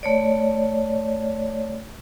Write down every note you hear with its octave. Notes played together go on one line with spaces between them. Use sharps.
A3 C#5 D5